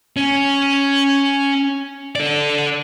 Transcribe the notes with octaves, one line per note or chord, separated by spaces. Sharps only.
C#4
A4 D5